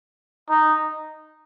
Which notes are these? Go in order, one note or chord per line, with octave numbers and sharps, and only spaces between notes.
D#4